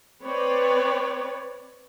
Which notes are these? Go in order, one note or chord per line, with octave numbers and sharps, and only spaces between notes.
C4 B4 C#5 D5